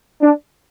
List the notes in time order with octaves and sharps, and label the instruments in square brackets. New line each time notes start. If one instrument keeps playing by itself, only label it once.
[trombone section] D4